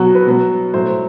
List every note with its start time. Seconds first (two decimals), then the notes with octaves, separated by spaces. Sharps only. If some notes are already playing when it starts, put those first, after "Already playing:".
Already playing: B2 F#3 F#4
0.15 B4
0.27 B2 F#3
0.74 A2 F#3 C5